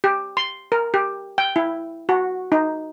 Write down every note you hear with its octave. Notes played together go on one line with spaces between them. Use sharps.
G4
C6
A#4
G4
G5
E4
F#4
D#4